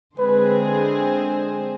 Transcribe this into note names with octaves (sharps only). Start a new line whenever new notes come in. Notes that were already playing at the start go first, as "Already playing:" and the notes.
D3 G#3 C4 G#4 B4 C5